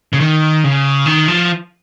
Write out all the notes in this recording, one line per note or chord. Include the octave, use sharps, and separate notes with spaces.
C#3
D#3
C#3
D#3
F3